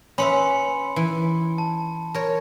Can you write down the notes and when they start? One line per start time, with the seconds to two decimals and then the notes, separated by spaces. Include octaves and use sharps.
0.18 C#4 B4 E5 B5 C6 C#7
0.96 E3
1.58 A5
2.14 A#4 C#5